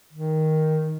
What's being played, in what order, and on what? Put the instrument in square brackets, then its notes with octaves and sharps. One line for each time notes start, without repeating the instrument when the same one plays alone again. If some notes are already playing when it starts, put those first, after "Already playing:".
[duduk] D#3